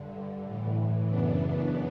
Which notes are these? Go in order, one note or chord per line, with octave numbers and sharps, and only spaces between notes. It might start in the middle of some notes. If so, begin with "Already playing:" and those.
Already playing: G2 D3
A2 E3
F#2 C#3 E3 B3 D4